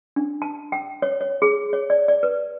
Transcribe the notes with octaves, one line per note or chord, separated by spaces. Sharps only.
D4
A5
G5
C#5
C#5
G#4
C#5
D5
D5
B4